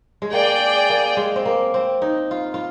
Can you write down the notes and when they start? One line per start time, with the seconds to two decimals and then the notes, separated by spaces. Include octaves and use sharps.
0.22 G#3
0.32 A#3 G#4 D5 G5
0.90 A#3
1.17 G#3
1.36 C4
1.46 A#3
1.74 C4
2.02 D#4
2.31 F4
2.54 F4